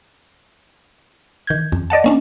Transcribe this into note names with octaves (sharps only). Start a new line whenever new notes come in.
D#3 G6 G#6
F2
D5 D#5 F#5 A5
A#3 C#4 D4